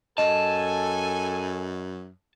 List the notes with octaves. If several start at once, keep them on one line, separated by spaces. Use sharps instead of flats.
F#2 A4 D#5 G#5 A5